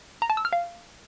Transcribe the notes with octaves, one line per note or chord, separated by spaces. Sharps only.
A#5
A5
E6
F6
F5